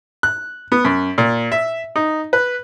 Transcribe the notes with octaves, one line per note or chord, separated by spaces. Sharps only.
F#6
B3
F#2
A#2
E5
D#4
B4